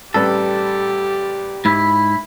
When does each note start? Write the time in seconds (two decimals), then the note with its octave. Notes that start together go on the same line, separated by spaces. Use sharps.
0.14 A1 G3 G4 A4 B4
1.65 G#2 E4 B5